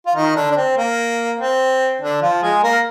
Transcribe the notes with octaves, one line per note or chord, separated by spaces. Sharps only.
F4
D#3 D#4
D3 D4
D4
C4
A#3
C4
D3 D4
F3 F4
G#3 G#4
A#3 A#4